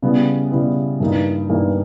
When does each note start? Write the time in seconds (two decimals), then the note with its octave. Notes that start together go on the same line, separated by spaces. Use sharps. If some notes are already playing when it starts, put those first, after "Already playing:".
0.03 C#3 G3 B3 E4
0.51 C#3 G3 B3 E4
1.00 G2 E3 A#3 D#4
1.49 G2 E3 A#3 D#4